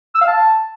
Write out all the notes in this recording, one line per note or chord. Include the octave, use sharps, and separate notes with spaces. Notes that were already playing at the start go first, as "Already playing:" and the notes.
E6
F5
A5